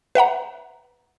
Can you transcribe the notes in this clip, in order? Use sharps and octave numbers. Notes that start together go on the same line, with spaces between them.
B4 E5 F#5 A#5